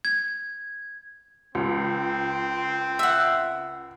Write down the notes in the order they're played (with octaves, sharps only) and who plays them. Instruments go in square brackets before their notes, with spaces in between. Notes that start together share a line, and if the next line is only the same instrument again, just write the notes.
[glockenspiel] G#6
[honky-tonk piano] C#2 [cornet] C4
[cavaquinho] E5 F#5